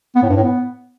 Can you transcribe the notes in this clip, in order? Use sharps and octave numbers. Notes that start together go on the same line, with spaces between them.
B3
A2
G2
A2
B3